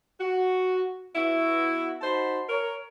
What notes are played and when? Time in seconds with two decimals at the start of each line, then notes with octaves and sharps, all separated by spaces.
0.20 F#4
1.15 B3 E4 F#4
2.01 D#4 F#4 C5 A5 B5 C6
2.48 A#4 C#5